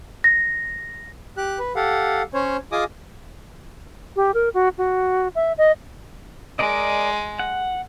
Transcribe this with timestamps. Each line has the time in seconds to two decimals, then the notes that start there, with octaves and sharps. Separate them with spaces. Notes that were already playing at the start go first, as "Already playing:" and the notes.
0.24 A#6
1.37 G4 F#6
1.59 B4
1.76 G4 A4 F5 F#5
2.34 C#4 C5 C#5
2.72 F4 G#4 D#5 G#5 D6 D#6
4.16 G4
4.34 A#4
4.54 F#4
4.78 F#4
5.35 E5
5.58 D#5
6.59 G#3 A#4 D5 D#5
7.39 F#5